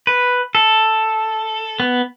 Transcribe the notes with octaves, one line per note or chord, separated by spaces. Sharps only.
B4
A4
B3